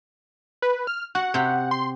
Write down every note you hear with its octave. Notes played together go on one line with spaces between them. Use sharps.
B4
F6
F#4 F#5
C3 G4
C6